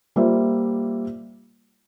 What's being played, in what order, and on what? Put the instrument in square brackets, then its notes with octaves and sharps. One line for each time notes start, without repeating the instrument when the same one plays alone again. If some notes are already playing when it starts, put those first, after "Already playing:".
[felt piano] G3 A#3 F4 C5 E5